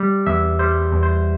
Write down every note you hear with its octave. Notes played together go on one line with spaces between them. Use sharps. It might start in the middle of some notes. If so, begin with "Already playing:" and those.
Already playing: G3
E2 E5
G3 C5
E2
C5